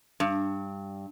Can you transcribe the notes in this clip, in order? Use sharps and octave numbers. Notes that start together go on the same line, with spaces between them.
G2